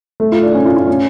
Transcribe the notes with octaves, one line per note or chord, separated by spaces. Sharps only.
A3
F4
D4
C#4
F4
F4
C#4